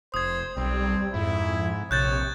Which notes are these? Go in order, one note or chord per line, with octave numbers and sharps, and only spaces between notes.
F1 C5 D#6 G#6
B1 G3 C4
F2 G#2 E4
A#1 C3 C#5 F#6 G6 A6